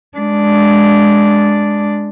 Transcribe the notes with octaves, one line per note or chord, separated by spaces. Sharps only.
G#3 D4